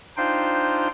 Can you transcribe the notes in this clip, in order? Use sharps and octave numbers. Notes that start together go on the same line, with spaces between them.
D4 D#4 F4 C5 F5 G5